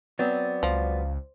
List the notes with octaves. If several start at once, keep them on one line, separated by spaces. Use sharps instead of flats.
F#3 B3 C4 D5
C#2 F3